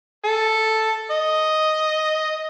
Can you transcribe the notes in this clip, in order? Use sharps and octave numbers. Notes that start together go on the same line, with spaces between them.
A4
D#5